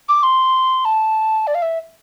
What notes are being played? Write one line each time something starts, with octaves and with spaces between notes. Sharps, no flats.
D6
C6
A5
D5
F5
E5